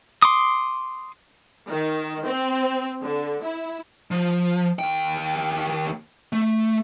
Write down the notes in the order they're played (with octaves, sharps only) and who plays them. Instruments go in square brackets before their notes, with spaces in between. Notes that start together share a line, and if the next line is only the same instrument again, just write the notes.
[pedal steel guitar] C6 D6 D#6
[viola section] D#3
C4
D3
E4
[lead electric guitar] F3
D#2 G5
A3